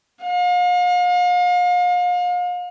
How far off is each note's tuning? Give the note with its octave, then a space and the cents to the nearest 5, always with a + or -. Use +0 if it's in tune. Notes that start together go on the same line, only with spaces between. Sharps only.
F5 +40